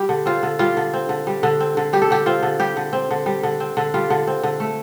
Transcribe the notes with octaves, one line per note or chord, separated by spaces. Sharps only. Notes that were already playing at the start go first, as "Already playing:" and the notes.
Already playing: G3 G4
D3
C4 F4
D3
G3 F4
D3
C4
D3
G3
D3
C4
D3
G3 G4
A4
D3 G4
C4 F4
D3
G3 G4
D3
C4
D3
G3
D3
C4
D3
G3 F4
D3
C4
D3
A3